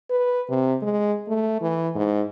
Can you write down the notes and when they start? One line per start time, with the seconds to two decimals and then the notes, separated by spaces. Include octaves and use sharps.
0.10 B4
0.49 C3
0.82 G#3
1.28 A3
1.61 E3
1.95 G#2